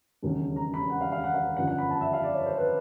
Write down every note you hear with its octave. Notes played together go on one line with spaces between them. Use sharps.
E1 D#2 C#3 F#3
A#5
B5
F#5
F5
F5
F#5
F5
G1 F#2 D3 F3 F#5
F#5
B5
A5
E5
F5
D5
C#5
C5
B4